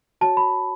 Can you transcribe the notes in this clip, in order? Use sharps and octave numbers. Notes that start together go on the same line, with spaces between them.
F#4 C#5 A5
B5